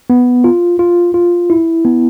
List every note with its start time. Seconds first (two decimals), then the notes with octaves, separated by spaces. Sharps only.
0.10 B3
0.44 F4
0.79 F4
1.14 F4
1.50 E4
1.85 B3